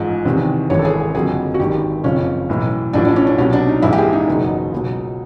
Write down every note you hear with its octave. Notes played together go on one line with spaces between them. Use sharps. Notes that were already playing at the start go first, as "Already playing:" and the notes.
Already playing: A1 G#2 F3
E2 C3 D#3
G#1 G2 E3 C#5
A4
G#4
G#4
F#1 F2 D3 F#3 G#4
F#4
G#1 G2 D#3 G4
F#1 F2 C#3 F3 C#4
B1 A2 E3
A1 A2 F3 D4
D4
C#4
D4
C2 B2 F#3 C#4
D4
D#4
A#1 G#2 E3 E4
G4
G#4
D#4
F#1 E2 B2 F#3
C#2 B2 F#3